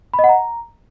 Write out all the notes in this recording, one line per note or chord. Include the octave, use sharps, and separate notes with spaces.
B5
D#5
F#5
A#5